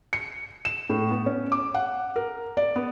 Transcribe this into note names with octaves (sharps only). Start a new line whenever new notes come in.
C#7
E7
A2
B3
C#4
D6
F#5
A#4
D5
B3